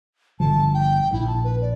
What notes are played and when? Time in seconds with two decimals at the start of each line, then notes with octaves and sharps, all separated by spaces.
0.40 G1 D3 F3 A5
0.74 G5
1.13 A#1 E4
1.27 A5
1.44 B4
1.62 D5